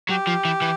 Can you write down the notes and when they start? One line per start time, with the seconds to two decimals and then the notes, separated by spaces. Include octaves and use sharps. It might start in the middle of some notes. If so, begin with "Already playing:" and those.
0.10 F#3 G4
0.28 F3
0.45 E3
0.61 E3